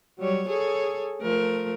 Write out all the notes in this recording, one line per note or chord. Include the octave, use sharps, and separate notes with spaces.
F#3 G3 C#5
G#4 A4 C#5
F3 A3 A#4